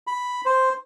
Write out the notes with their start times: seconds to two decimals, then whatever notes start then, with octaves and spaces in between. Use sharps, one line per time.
0.07 B5
0.45 C5